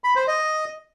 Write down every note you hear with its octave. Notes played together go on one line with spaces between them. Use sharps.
B5
C5
D#5